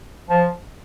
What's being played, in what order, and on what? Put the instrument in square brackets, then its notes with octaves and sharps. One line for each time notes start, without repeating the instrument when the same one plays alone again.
[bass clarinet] F3